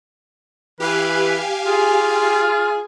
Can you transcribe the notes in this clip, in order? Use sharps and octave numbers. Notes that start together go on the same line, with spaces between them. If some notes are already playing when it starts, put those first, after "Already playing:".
E3 G4 B4 F5 G#5
F4 G#4